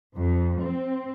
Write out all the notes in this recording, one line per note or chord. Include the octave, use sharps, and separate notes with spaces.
F2
C4